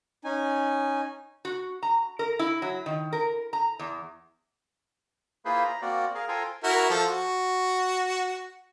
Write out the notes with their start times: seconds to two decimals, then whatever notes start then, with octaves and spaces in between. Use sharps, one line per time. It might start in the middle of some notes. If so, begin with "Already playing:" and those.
0.24 C#4 D#4 G#5
1.45 F#4
1.83 A#5
2.19 A#4
2.39 E4
2.62 F#3
2.86 D#3
3.13 A#4
3.53 A#5
3.79 E2
5.45 A#3 E4 F4 G#4 B4 C5
5.64 A#5
5.82 A#3 C4 F#4 D5
6.15 G#4 A#4 F5
6.29 F4 A4 C5 G5 G#5 A#5
6.63 E4 F#4 A#4
6.90 F3 A4
7.07 F#4